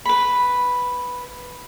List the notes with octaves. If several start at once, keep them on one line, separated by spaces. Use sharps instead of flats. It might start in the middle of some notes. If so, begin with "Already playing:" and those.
B4 B5